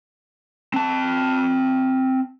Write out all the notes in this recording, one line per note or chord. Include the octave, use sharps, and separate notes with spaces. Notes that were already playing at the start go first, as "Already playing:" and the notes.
C4 A5